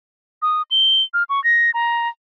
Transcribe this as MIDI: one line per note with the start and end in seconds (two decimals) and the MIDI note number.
0.42 0.62 87
0.71 1.03 103
1.14 1.23 89
1.29 1.43 85
1.44 1.71 94
1.74 2.08 82